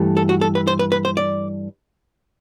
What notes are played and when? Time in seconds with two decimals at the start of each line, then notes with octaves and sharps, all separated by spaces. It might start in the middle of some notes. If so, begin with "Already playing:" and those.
Already playing: G2 E3 A3
0.17 A4
0.29 F#4
0.41 A4
0.55 B4
0.67 C5
0.79 B4
0.92 B4
1.05 C5
1.17 D5